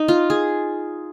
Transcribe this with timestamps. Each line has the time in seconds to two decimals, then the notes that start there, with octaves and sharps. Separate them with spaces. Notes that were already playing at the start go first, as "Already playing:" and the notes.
Already playing: D#4
0.08 F4
0.30 G#4